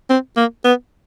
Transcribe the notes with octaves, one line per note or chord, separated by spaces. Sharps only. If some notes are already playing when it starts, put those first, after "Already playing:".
C4
A#3
B3